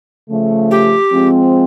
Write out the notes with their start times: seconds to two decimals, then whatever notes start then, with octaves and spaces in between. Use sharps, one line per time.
0.30 C#3 F3 A3
0.71 G4
1.12 F3 G#3 C4